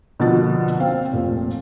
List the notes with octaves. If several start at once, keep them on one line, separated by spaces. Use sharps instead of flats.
B2 D3 F3 A#3 F#4 A6
C4 F5
F1 A#2